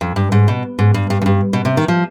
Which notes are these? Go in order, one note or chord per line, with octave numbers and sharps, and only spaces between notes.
F2
G2
G#2
B2
G#2
G2
G2
F2
G2
B2
C3
D#3
F3